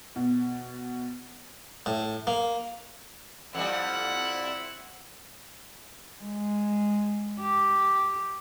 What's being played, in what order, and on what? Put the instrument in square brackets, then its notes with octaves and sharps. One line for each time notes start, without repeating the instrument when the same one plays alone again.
[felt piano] B2
[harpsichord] A2
A#3
[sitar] F2 G3 [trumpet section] C4 E4 [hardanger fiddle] F#5
[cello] G#3
G4